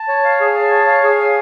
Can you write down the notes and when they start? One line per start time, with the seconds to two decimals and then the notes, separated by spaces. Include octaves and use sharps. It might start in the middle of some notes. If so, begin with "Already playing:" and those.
Already playing: A5
0.08 C#5
0.25 F5
0.40 G#4
0.55 A5
0.71 C#5
0.87 F5
1.04 G#4
1.19 G#5